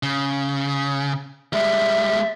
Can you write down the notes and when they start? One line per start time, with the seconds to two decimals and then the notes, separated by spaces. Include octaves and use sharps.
0.03 C#3
1.53 G3 G#3 E5